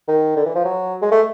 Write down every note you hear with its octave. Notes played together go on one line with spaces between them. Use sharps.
D#3
D3
E3
F3
F#3
G#3
A3